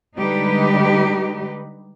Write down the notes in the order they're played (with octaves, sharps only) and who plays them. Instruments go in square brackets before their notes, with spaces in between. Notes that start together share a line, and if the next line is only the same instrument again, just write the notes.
[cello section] D3 G3 G#3 D#4 G4 B4